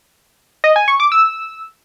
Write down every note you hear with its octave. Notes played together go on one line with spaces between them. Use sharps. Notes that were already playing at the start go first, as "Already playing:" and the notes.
D#5
G#5
C#6
D6
E6